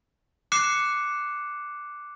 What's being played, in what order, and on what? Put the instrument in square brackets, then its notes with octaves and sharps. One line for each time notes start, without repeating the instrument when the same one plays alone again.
[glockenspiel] D6 F#6 C7 C#7 E7